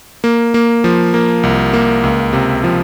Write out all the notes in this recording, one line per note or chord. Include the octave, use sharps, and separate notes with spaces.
A#3
A#3
F3
A#3
C2
A#3
C#2
C3
F3